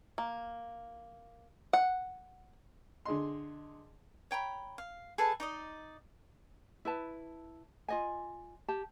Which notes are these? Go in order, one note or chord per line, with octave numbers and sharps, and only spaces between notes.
A#3
F#5
D3 G#4 D#5 C6
C#5 G5 A#5 B5
F5
G#4 A4 B4 A5
D#4 D5 D#5
E4 B4 A5
F4 D#5 G#5
G4 A5